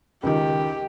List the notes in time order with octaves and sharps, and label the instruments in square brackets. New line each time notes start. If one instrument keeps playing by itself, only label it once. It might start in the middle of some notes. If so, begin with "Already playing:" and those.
[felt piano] C#2 D#3 [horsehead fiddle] G4